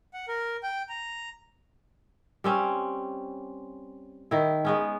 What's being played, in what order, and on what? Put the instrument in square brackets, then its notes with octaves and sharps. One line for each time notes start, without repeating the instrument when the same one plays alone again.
[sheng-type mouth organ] F#5
A#4
G5
A#5
[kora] G3 C4 C#4
D#3 E4
G#3 B3 C#4